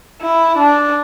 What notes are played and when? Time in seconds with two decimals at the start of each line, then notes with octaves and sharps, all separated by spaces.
0.22 E4
0.58 D4